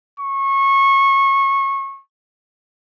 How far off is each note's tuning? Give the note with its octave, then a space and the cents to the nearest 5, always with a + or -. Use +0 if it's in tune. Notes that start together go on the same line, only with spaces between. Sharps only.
C#6 -20